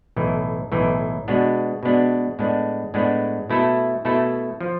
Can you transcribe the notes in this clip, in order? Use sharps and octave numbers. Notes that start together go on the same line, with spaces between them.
B1 A2 E3
B1 A2 E3
B2 G#3 B3 D4
B2 G#3 B3 D4
A2 G#3 B3 D4
A2 G#3 B3 D4
B2 A3 E4 A4
B2 A3 E4 A4
F3